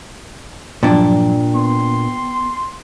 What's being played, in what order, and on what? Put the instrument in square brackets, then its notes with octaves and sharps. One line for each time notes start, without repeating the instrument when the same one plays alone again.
[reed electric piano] G2 F3 F#3 [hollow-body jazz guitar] A#2 D4 [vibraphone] G5
[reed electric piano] B3 [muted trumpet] C6